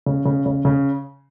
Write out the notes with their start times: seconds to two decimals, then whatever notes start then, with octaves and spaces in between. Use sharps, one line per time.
0.06 C#3
0.26 C#3
0.46 C#3
0.65 C#3